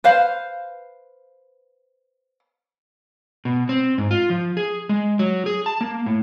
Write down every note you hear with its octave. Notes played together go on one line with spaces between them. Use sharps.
B4 C5 F5
B2
C4
G#2
F4
F3
G#4
G#3
F#3
G#4
A5
A#3
A2